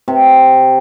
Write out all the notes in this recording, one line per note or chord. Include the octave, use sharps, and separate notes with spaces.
C3